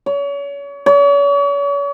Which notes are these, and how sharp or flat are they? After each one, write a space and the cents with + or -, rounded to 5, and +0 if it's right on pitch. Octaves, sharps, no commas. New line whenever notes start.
C#5 +35
C#5 +40